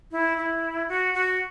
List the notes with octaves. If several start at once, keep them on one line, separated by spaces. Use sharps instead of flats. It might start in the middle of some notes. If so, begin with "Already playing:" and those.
E4
E4
F#4
F#4